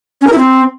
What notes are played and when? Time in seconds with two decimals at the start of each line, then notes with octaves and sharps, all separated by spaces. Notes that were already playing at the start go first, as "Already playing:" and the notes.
0.21 C#4
0.27 A#4
0.32 E4
0.38 C4